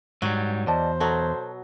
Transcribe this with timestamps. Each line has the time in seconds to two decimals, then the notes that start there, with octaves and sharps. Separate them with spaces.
0.22 G#2 F#3 G3
0.67 E2 C5 D5 D#5 A5
1.00 B2 F#3 A4 A#5